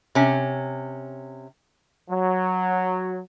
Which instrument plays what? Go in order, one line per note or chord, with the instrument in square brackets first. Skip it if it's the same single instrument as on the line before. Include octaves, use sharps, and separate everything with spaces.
[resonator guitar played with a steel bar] C3 C#4
[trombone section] F#3